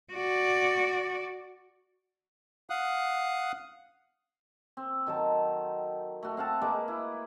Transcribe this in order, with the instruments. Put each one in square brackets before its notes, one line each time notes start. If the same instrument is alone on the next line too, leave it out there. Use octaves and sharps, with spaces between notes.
[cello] F#4 D5
[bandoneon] F5 F#5 D#6 F#6
[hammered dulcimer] C4
D#3 F#3 A4 A5
A3 F#4
C4 F5 F#5 A5
G#3 A#3 B4 D6
E4